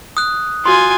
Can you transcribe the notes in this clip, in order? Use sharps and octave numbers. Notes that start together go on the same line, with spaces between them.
D#6 F#6
F4 F#4 G#5 C6